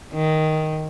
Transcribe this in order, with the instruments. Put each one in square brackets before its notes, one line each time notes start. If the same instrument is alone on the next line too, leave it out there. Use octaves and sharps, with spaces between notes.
[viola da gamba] D#3